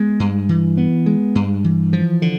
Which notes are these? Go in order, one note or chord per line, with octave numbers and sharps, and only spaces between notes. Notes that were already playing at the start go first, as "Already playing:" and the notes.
Already playing: G#3 B3
G2
E3
B3
G#3
G2
E3
F3
D3